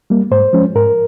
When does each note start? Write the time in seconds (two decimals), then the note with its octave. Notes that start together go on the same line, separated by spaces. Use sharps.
0.10 G3 A#3
0.31 G#2 C5
0.53 F3 G#3 C#4
0.75 G#2 A#4